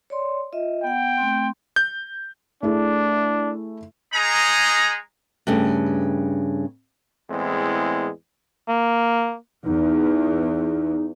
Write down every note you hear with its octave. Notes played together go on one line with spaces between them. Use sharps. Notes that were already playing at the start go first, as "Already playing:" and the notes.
C#5 D5 C6
F4 D#5 E5
B3 F#5 G5
A3 C4 C6
G6
A3 D4 E4 G#4
G#3 D#4 G#4 A#5
G2 C#3 A3
E2 A2 G#3 C4
A#3
E2 D#4